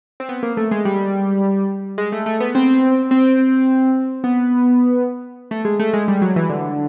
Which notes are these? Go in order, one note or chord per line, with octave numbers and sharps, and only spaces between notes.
C4
B3
A#3
A3
G#3
G3
G#3
A3
A3
B3
C4
C4
B3
A3
G#3
A3
G#3
G3
F#3
E3
D3